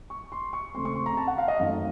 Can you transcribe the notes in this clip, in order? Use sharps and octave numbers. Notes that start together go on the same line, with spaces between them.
C#6
C6
C#6
C#3 A3 C4 C6
C#6
C6
A#5
A5
F#5
F5
D#5
F#2 D#3 A3 C4 F5